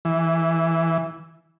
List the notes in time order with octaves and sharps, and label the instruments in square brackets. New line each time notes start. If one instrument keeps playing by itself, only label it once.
[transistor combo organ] E3